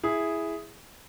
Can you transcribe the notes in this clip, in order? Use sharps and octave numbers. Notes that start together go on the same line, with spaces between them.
E4 G#4